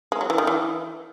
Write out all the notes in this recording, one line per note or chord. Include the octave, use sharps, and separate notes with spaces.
G#3
F#3
E3
D#3
E3